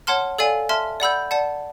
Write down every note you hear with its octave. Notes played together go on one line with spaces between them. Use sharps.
C#5 F#5 A5 C6 F6
A4 D5 F5 G#5
E5 A5 C6 F6
D5 F#5 B5 E6 G6
D5 F#5 A5